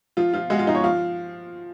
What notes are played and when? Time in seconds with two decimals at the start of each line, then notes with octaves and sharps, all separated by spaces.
0.17 F3 F4
0.34 F3 F4
0.50 G#3 F#4
0.59 F4
0.67 F3 D#4
0.75 C#5
0.84 F3 F5